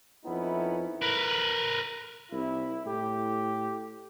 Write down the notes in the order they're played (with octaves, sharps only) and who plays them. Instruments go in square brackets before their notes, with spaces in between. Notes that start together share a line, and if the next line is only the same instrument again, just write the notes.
[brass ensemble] F2 B3 C#4 D#4 E4
[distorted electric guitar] A#4 B4
[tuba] C2 [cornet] E4
[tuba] A2 [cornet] G4